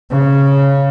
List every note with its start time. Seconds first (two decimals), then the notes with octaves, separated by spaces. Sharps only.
0.10 C#3